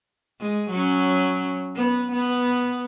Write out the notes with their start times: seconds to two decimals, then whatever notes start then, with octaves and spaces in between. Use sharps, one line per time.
0.40 G#3
0.71 F#3 C#4
1.75 B3
2.13 B3